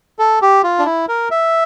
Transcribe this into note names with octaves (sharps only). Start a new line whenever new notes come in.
A4
G4
F4
D4
E4
A#4
E5